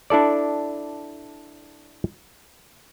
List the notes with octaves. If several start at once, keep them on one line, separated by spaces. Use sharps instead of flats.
D4 E4 A4 D5